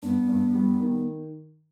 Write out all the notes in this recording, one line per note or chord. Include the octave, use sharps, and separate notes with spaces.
G2 B3
G2
G3
D#3